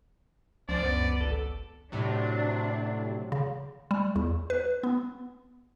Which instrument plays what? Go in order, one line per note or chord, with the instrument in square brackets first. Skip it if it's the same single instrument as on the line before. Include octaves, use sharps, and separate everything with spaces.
[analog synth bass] C#2 [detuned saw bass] F3 [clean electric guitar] D4 C5 [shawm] D5
[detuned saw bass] F#2 [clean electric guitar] B3
[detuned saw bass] G#1 [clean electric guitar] A4
[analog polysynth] A2 C3 F#3 [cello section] D4
[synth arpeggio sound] C#3
G3
E2
B4
B3